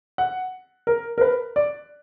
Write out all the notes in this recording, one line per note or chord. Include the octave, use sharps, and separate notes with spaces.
F#5
A#4
A#4
B4
D5